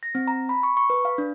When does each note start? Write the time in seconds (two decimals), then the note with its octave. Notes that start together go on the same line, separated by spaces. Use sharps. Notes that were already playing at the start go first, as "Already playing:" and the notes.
0.03 A#6
0.15 C4
0.27 A#5
0.49 B5
0.63 C#6
0.77 C#6
0.90 B4
1.05 F5
1.18 D4